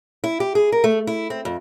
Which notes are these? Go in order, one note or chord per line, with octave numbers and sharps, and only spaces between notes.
E4
G4
G#4
A#4
A3
E4
C4
F2